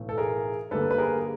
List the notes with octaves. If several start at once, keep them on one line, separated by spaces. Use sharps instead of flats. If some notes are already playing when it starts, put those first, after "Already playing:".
Already playing: B1 A2 E3 A3
A4
G#4 A#4
G2 D3 G3 A#3 A4 B4
B4
G#4 A#4